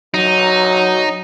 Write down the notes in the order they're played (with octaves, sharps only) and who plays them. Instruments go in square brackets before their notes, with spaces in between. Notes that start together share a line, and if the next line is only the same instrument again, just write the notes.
[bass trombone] F#3 [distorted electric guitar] D#4